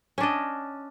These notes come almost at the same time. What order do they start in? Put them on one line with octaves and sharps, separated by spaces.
C#4 D4 D#5